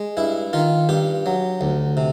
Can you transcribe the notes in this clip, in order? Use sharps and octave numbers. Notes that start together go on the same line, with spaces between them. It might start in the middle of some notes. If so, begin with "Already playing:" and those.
Already playing: G#3
G2 E4
D#3 F4
G2 G4
F#3
D2
C3